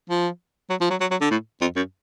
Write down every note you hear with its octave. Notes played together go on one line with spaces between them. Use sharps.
F3
F#3
F3
F#3
F#3
F#3
D3
A2
F2
F#2